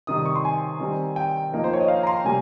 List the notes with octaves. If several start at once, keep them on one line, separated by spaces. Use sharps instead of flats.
C3 D#3 G3 D#6
D#6
C#6
C6
G#5
D#3 G3 C4 D#4
G5
F3 A#3 D#4
C5
C#5
D#5
F5
A#5
C6
C3 G3 A#3 G#5